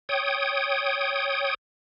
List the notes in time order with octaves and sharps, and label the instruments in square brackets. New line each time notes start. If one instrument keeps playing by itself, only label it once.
[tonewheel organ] C#5 G5 D#6